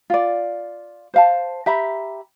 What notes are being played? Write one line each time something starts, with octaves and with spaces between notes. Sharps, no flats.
F4 D5
C5 F5 A5
G4 E5 A#5 B5